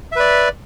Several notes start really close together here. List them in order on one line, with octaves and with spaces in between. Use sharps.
E5 B4 D5